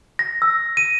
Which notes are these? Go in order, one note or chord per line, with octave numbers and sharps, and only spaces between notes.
A#6
E6
D#7